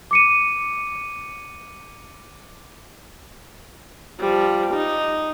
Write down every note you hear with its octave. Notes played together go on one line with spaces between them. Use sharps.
D6 C#7 D#7
F3 G3
D#4